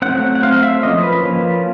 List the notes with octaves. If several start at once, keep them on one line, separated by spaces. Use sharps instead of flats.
F#3 A3 C4 F#5
F#5
F#3 A3 C4 F5
E5
F3 A#3 C#4 D#5
B4
F3 A#3 C#4